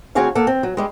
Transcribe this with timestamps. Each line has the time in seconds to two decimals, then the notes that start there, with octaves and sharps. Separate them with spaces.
0.15 D2 C4 F#4 G#4 C#5 F5
0.35 A#3 A4 F#5
0.47 C4
0.63 F#3
0.77 G3 G#3